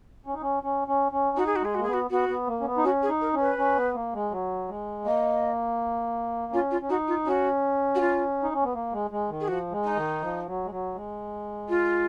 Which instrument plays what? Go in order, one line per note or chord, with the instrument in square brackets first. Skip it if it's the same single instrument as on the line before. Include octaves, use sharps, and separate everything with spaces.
[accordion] C#4
D#4
C#4
C#4
C#4
C#4
[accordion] D#4 [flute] F#4
[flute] G#4
F#4
[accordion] G#3 [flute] G#4
[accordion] A#3 [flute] F#4
[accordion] B3 [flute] G#4
[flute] F#4
[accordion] B3 [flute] F#4
[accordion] B3
A#3
C#4
B3
D#4
[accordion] C#4 [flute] F#4
[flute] G#4
[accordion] D#4
[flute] A#4
[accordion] C#4
[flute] B4
[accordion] C#4
B3
A#3
G#3
F#3
G#3
[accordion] A#3 [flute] D#5
[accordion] C#4 [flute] F4
[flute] F4
[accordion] C#4
[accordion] D#4 [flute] F#4
[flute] F4
[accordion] C#4 [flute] F#4
[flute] F#4
F4
[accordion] D#4
C#4
B3
A#3
G#3
G#3
D#3
[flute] G#4
[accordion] F3 [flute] F#4
[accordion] G#3
[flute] D#4
[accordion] D#3
F3
F#3
G#3
F#3
G#3
[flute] F4